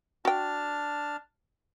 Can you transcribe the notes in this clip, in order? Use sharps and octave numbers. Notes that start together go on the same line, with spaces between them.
D4 F#4 G5 A5 F6